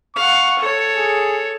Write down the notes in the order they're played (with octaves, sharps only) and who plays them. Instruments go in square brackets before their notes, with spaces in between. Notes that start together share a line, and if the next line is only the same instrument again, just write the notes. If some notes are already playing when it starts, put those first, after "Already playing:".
[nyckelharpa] F5 F#5 [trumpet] C#6
[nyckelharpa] A4 C#5
[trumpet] G#4